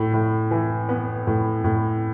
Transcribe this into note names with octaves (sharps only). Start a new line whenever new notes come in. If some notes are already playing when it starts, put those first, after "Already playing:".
Already playing: A2
A2
E3
B3
A2
A2